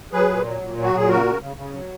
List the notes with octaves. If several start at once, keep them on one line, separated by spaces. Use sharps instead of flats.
F#3 G#4 B4
A#2
F#3
A#2
F#3
F#4
A#2 G#4
C#3 F#4 A#4
C#3
C#3
C#3
F#3